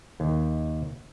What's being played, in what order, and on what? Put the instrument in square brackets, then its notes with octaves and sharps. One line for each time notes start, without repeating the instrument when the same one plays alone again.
[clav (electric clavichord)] D#2